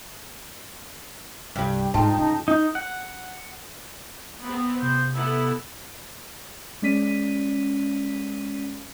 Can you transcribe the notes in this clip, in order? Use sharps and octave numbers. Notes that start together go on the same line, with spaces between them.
C2 G2 G3
G#2 D#4 F4 G5 A5
G2 C#3 D#4
D#4
F#5
B3 C4
C3 C5
B3 E4 A4 E5
G#3 C#4 D5 B6 D#7